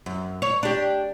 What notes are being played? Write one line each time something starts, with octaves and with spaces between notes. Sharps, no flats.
F#2
C#5
D4 G4